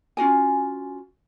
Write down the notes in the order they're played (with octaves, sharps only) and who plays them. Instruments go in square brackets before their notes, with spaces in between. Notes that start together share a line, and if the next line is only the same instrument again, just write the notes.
[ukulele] C#4 F4 F#4 G#5